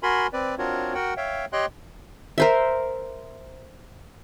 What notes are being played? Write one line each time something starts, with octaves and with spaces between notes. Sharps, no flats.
F#4 A#4 G#5 B5 C6
C4 B4 D5
C4 D4 F4 F#4 A#4 C#5
F#4 A#4 F#5 G5
C#5 E5 F5 G5
G4 C#5 D#5 G5 C6 F#6
A#4 C5 E5